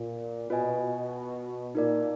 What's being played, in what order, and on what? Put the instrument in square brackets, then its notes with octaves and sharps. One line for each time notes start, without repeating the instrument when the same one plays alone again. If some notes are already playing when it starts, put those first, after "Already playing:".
Already playing: [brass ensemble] A#2
[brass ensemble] B2 [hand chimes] F4 B4 D#5 G#5
[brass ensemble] B2
[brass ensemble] A#2 [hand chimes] D#4 A#4 D5